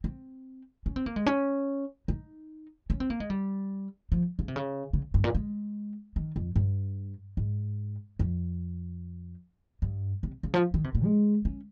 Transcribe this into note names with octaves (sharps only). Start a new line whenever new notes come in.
C4
C#4
C4
A#3
G#3
C#4
D#4
C#4
C4
A#3
G#3
G3
F3
C#3
C3
C#3
C#3
G2
A#2
G#3
D#3
F2
G2
G#2
F2
G2
C3
C#3
F3
D#3
C3
A#2
G#3
C#4